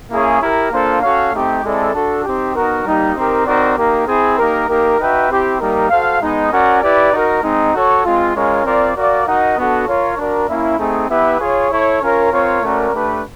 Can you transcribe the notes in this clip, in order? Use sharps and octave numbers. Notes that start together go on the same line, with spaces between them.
A#3 C#4 E4 G#4 C#5
E4 G4 A#4
A#3 D4 F4 A4 C5
C#4 F#4 A4 C#5 F5
A3 C4 D#4 G4
G#3 C4 E4 A4 D5
D4 F#4 A4
C4 D#4 G4
B3 D#4 F#4 A#4
G3 A#3 D#4 G4
C4 D#4 G4 A#4
C4 D#4 F#4 A#4 D5
A#3 D#4 G4 A#4
C4 E4 G#4
A#3 D#4 G4 A#4
A#3 D#4 G4 A#4
D#4 F#4 B4 E5 G5
C4 E4 G4
G3 A#3 D#4 G4 A#4
F#4 A4 C5 F5
G#3 B3 D#4
C#4 F#4 A#4 D5 F#5
E4 G4 B4 D5
D#4 F#4 A#4
G#3 C4 D#4
F#4 A4 C#5
G#3 C4 F4
G#3 C#4 F4 A#4 C#5
C4 F4 A#4 D5
F#4 A#4 D5 F5
D#4 F#4 A#4 D#5 F#5
B3 D4 F#4 A4
F4 A#4 C#5
D4 F#4 A#4 D5
A#3 C#4 E4
A3 C4 D#4 G#4
B3 E4 G4 B4 E5
F4 G#4 C#5
E4 A4 C#5
C#4 F4 A#4 C#5
C4 F4 A#4 C#5
A3 C#4 F#4 A#4 D5
A3 D4 G4 B4